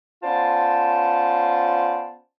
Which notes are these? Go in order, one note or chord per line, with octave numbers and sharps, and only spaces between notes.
B3 C#4 F4 C5 D5 A5